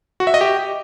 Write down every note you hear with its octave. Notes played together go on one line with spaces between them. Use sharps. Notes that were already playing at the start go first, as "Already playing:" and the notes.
F#4
E5
D#5
G4